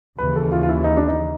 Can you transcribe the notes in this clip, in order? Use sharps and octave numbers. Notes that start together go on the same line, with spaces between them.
D#2 C#3 E3 B4
A4
F4
F4
E4
D#4
D4
D#4